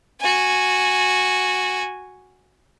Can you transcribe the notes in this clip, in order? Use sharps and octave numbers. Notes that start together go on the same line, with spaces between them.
F#4 G#5